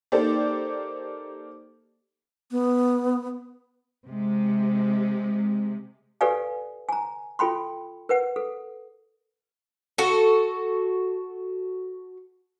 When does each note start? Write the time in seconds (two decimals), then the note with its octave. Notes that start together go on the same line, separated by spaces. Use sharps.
0.12 A#3 D#4 G4 A4 C5 D5
2.51 B3
4.07 C3 G#3
6.21 G4 A4 B4 D5 F5 G#5
6.89 G#5 A#5
7.39 F4 A4 G5 B5 C6
8.09 A#4 B4 F#5
8.36 A4
9.98 F#4 A4